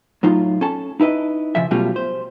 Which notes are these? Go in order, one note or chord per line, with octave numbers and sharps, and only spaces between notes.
A2 F#3 D#4 F4
C#4 A4 A5
D#4 E4 B4 D#5
C#3 F3 E5
B2 F#3 G3 A3 C#4 F4
C5